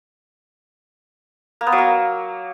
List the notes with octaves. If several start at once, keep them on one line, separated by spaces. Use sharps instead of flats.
A#3
B3
F#3
A#3